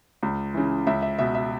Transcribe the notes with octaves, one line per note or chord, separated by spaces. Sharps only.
C#2
C#3 E3
C#2 E5
E5
B2 E5
E5